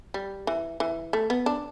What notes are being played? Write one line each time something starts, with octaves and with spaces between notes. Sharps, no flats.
G3
E3
E3
A3
B3
D4